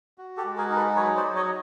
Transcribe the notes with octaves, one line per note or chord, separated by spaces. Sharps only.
F#4
G4 A4
G#3
G#4 A#4
D#4 A#4
A4 B4
F#3 B4 C#5
C5 D5
F#3
C#5 D#5